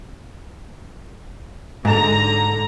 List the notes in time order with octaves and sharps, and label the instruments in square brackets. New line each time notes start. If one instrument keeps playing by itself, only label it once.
[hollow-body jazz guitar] G#2 [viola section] D3 A#5